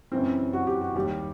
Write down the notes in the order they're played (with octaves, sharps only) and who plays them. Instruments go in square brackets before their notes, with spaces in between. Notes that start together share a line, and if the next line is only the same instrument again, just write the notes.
[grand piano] F#2 C#3 E3 [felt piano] C4
[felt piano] F#4
G4
F#4
[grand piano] D#2 D#3 G3 [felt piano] G4